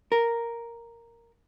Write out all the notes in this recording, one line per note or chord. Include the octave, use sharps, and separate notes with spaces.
A#4